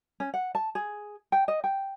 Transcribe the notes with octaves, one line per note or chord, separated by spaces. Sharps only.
C#4
F#5
A5
G#4
G5
D#5
G5